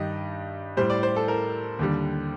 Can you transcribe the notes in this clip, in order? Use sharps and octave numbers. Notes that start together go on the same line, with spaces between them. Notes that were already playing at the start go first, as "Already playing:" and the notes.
Already playing: G2 D#3 G3 D#5
A2 G3 C5
D5
C5
A4
A#4
D#2 D3 G3